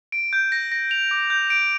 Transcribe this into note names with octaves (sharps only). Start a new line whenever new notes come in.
D7
G6
A#6
A#6
F7
D6
G6
D7